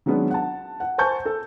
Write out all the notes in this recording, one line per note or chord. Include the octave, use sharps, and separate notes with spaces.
D#3 F#3 G#3 B3 C#4 D4
F#5 A5
F#5
C5 G#5 A5 C#6 G6
A4